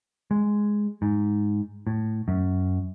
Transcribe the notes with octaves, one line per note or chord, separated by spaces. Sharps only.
G#3
G#2
A2
F#2